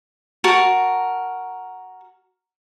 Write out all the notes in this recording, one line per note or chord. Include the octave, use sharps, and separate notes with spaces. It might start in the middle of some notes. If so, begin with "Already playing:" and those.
F#4 A#4 A5